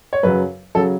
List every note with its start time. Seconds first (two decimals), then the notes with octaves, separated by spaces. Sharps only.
0.13 C#5
0.23 F#2 C#3 F#3 B4
0.75 C#3 F#3 A4